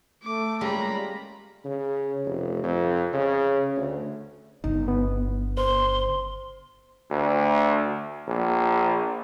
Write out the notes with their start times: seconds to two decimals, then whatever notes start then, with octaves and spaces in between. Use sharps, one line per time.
0.23 A3 D6
0.61 G3 G#3 A#3 C#4 F4 A#5 B5
1.65 C#3
2.25 F1
2.64 F2
3.14 C#3
3.77 D2
4.64 G1 C#3 D#4
4.88 B3
5.57 C5 C6
7.11 D2
8.27 A#1